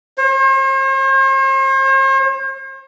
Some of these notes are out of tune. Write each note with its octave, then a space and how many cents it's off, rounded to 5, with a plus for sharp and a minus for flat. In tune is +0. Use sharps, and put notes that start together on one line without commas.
C5 +45